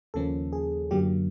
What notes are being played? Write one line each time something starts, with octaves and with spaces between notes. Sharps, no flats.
D#2 C#3 F3 A#3 C#4 A4
G#4
F#2 D3 F#3 A#3 G4